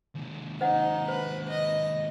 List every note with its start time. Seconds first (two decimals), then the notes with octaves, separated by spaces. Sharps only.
0.15 D#2 C3
0.61 D#4 C5 D#5 F#5
1.09 B4 C5
1.49 D#5